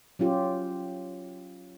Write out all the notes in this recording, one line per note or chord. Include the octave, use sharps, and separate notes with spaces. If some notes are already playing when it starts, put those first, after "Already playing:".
F#3 C#4 F4 G4